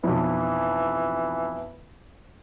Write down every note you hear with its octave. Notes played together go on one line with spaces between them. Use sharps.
B1 F2 E3